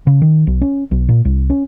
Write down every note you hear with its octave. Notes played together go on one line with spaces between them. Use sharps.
C#3
D#3
B1
C#4
B1
A#2
C2
C#4